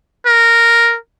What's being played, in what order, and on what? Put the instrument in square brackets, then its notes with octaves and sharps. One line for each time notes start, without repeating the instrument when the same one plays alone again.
[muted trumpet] A#4